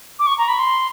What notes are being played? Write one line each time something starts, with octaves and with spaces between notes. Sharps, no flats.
D6
C#6
A#5
B5
C6